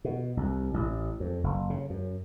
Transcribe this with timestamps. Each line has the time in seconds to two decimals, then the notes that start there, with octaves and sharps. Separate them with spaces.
0.05 B2
0.37 C2
0.74 A1
1.20 F2
1.44 F#1
1.70 C#3
1.90 F#2